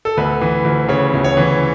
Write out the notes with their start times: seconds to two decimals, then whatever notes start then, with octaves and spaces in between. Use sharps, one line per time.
0.05 A4
0.17 D2 B4
0.41 E3
0.65 D2
0.88 C#3 C#5
1.13 D2
1.24 C#5
1.37 E3